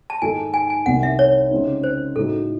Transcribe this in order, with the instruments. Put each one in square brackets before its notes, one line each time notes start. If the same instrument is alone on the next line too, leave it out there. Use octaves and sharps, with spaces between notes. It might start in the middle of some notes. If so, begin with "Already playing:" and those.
[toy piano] A5
[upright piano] G#2 D#3 G#3 D#4 A4 [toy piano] G#5
[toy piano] G#5
G#5
[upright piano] C2 C3 D#3 [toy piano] F#5
[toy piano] E5
C#5
[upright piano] C#3 G#3 C4 D#4
[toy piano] C5
[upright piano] A2 G#3 D#4 F#4 [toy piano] A4